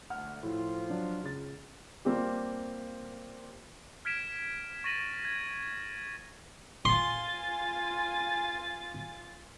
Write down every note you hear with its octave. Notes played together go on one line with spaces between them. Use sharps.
D2 F#5 F6
A2 F3 F4
F#3 D4
C#2 A6
G3 A#3 C4 F4 G4
F6 G#6 B6 D7 E7
C#6 A6 A#6 D#7 F#7
G#6
F4 G#5 C6 A6